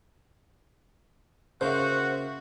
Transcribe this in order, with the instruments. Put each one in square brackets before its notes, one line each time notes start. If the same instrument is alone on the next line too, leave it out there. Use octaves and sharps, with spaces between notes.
[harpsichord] C#3 A#3 [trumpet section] F#4 [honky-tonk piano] C5 E5